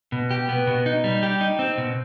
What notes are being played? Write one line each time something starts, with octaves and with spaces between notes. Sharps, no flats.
B2
G4
B3
B2
D#4
G3
G4
D#4
C4
B2